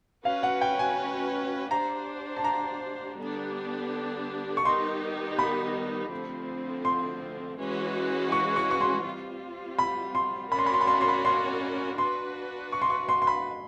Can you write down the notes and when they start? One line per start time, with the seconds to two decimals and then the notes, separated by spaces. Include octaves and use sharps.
0.25 C#4 F#4 B4 F5
0.43 F#5
0.61 G5
0.79 G#5
1.71 D4 G4 C5 A#5
2.37 A5
2.44 A#5
3.18 D3 G3 B3 D4 G4
4.57 C#6
4.65 D#3 G3 B3 D#4 G4 C6
5.39 B5
6.11 D3 F3 A3 C4
6.85 C6
7.58 E3 G#3 C#4 F#4 B4
8.32 C#6
8.56 C#6
8.71 C#6
8.81 C6
9.05 G3 C4 F4
9.79 B5
10.15 C6
10.51 C#4 F#4 A#4 D5 B5
10.59 C6
10.66 B5
10.74 C6
10.81 B5
10.87 C6
10.94 B5
11.01 C6
11.08 B5
11.25 C6
11.98 D4 F#4 B4 C6
12.72 C#6
12.82 C6
12.90 C#6
13.09 C6
13.22 C6
13.27 B5